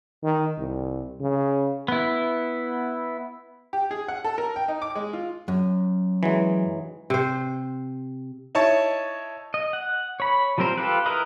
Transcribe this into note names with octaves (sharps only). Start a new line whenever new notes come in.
D#3
C2
C#3
B3 E4
G4
G#4
F#5
A4
A#4
G5
D#4
D6
G#3
F4
F#2
E3 F#3 G#3
C3 C5
D#4 E4 C#5 A5 C#6
D#5
F#5
C#5 B5
F3 G3 C4 A#4 C5
F4 G4 A4 B4
E4 A#4 B4 D#5